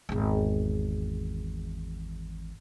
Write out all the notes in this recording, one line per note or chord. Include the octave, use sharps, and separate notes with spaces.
G#1 E2